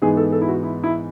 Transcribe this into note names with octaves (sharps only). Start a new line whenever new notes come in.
G#2 E3 G#3 B3 G#4
A4
A4
E4
F#4
E4
E4